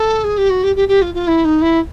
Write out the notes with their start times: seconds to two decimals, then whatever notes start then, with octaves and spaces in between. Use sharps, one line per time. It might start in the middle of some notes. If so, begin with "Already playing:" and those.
Already playing: A4
0.24 G#4
0.37 G4
0.49 F#4
0.63 G4
0.75 G4
0.88 G4
1.01 F4
1.14 F4
1.27 E4
1.44 D#4
1.61 E4